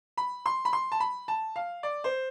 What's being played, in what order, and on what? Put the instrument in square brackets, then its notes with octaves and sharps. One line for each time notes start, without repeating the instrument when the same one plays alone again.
[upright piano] B5
C6
B5
C6
A5
B5
A5
F5
D5
C5